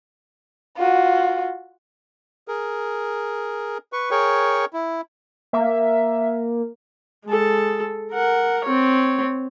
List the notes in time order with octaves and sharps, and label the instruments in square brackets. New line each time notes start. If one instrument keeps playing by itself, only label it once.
[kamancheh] F4 F#4
[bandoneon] G#4 A#4
B4 C#6
G#4 A#4 C#5 G5 C#6
E4
[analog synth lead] A#3 [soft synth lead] E5
[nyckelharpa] G#3 A4
A#4 F#5
C4 C#5